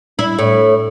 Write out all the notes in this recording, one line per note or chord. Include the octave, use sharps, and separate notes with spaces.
E4
A2